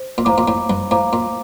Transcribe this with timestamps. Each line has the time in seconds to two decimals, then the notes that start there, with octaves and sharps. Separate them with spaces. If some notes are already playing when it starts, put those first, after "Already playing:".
Already playing: C5
0.18 A#2
0.25 A2 C5 F5 A#5 D6
0.38 A#2
0.48 A2
0.70 G2
0.91 A2 C5 F5 A#5 D6
1.13 A#2